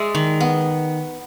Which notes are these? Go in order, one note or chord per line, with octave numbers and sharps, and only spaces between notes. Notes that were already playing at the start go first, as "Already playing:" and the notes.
Already playing: G#3 D5 E5
D#3
B3